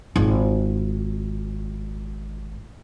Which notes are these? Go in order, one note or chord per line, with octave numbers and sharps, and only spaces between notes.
G#1 F4